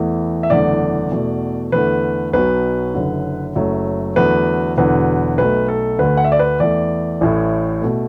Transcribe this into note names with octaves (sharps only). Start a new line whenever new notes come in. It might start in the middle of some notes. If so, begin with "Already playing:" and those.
Already playing: E2 E3 A3
E5
F#1 E2 D3 A3 D5
E2 B2 A3
E2 D3 A3 B4
B1 B2 F#3 B4
F#1 F#2 D3
F#1 F#2 F#3 A3
E2 D3 F#3 A3 B4
E1 E2 D3 F#3 B4
B1 B2 A3 B4
A4
D2 D3 A3 B4
F#5
E5
D5
B4
E2 E3 A3 D5
A1 A2 A3
B2 A3